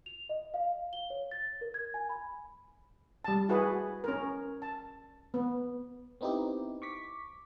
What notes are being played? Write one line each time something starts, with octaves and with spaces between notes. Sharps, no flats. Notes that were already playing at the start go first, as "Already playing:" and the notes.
F7
D#5
F5
G7
C#5
A6
A#4
G#6
G#5
B5
G3 A5
E4 F#4 G#4 B4
C#4 A#4
A5
B3
B3 C4 D#4 E4 G4
C#6 D6 B6